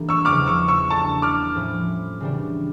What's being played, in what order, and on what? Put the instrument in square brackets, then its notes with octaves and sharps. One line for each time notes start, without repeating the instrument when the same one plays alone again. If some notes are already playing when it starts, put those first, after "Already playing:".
Already playing: [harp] E3 G3 A#3 D4 A4
[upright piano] C#6 E6
[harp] E2 C#3 F3 [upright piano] D6 F6
[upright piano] C#6 E6
C#6 E6
[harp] G3 D4 A4 [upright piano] A5 C#6
[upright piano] D6 F6
[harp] A2 F3 C#4 E4
C#3 E3 G3 D4